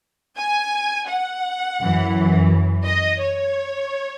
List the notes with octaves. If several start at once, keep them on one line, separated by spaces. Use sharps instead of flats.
G#5
F#5
F#2 E3
D#5
C#5